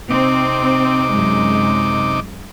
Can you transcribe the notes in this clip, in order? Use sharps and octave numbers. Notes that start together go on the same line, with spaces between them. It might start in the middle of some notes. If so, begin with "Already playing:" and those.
C3 C4 D#4 D6
F#2 G#3